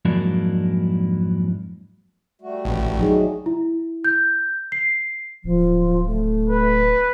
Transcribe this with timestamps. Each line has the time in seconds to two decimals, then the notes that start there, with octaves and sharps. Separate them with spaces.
0.05 F2 G#2 F#3 A#3 D4 E4
2.41 G3 A3 F#4
2.65 A1
2.99 F#3 D#4 G#4
3.46 E4
4.04 G6
4.72 C7
5.44 D1 F3
6.06 A3
6.50 B4